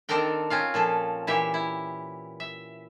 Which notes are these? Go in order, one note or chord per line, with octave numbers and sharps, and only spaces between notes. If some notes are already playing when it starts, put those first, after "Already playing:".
D#3 C4 D4 A4 A#4 G5
C4 C#4 F4 F5
A#2 F3 A4
A#2 E3 G4 E5
E4
E5